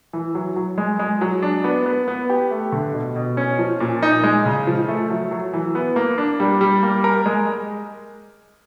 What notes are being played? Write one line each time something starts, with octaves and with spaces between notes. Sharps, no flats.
E3
F#3
F#3
G#3
G#3
F#3
D4
B3
B3
B3
G4
A3
D3
B2
B2
C#4
F3
A#2
D#4
G#3
C#3
F3
A3
F#3
F#3
E3
B3
A#3
D4
G3
G3
A#3
A#4
G#3